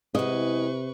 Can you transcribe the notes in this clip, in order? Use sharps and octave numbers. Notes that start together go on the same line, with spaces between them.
E2 C3 G#3 B4 D#5 C#6